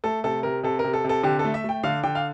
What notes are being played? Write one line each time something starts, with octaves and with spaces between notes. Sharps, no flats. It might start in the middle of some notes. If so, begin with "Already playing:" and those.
A3 A4
C3 A4
C3 A#4
C3 A4
A#4
C3
A4
C3 A4
D3 G4
A4
A3
E5
A3 G5
D3 F5
D3 G5
F5